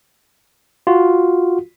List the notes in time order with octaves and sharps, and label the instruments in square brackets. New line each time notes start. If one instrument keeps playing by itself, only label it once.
[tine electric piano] F4 F#4